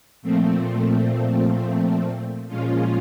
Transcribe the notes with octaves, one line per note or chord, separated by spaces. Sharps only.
A#2 F3 A3 C4
A#2 F3 G#3 C#4 F4